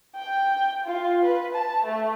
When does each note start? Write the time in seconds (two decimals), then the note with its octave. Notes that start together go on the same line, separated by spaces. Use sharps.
0.15 G5
0.85 F4
1.24 B4
1.54 A5
1.85 A3